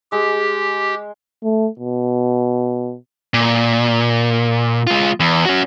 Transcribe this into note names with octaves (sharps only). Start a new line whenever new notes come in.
G#3 G4
A3
B2
A#2
G#3 F4
E2
C#4 F#4